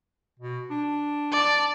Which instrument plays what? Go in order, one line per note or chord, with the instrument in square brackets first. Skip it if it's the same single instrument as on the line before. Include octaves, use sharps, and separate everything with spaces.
[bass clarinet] B2
D4
[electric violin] D5 A5